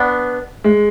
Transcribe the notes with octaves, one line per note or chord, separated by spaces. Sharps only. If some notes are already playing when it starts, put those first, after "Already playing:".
Already playing: B3 D4
G#3